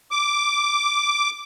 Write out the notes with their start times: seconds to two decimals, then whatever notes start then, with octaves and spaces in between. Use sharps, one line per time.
0.11 D6